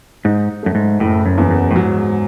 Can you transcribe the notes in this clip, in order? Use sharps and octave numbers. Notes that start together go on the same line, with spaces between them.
G#2 D#4
F#2 A3
G#2
F#1 A2
F#2
E2
F#2
A2
G#2 F#3